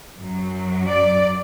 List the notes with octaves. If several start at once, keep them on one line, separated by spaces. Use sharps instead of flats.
F#2 F#3
D5